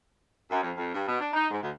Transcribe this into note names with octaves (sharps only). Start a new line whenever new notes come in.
F#2
F2
F2
G2
B2
D4
D#4
G#2
D2